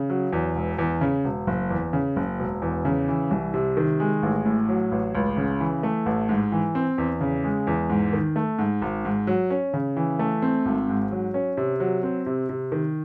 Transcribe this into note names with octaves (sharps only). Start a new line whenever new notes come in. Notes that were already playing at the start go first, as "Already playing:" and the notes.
Already playing: C#3
F#3
E2
E1
E2
C#3
E1
F#1
E2
C#3
F#1
E1
E2
C#3
E3
C2
C3
D#3
G#3
A1
A2
F#3
A1
C#2
C#3
E3
A3
A1
G#2
E3
C4
E2
C#3
G#3
E2
G#2
D#3
A3
G#2
G#1
G#2
F#3
C#4
C#3
E3
A3
C4
G#1
G#2
F#3
C#4
C3
F#3
C4
C3
C3
D#3